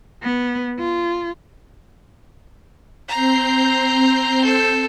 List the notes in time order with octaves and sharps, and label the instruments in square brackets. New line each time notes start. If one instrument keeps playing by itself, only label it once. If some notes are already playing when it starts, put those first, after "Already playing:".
[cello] B3
F4
[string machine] C4 G6 C7 [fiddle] A#5
[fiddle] A4